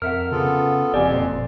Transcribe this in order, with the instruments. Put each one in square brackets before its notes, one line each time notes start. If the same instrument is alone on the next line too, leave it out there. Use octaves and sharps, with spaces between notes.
[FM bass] F2 [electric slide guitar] A#4 E5 F#5 [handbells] F6
[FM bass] C#3 [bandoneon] B3 F4 A4
[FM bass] F#1 [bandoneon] F2 [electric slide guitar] G4 G#5 [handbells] D5
[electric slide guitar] A#2 C5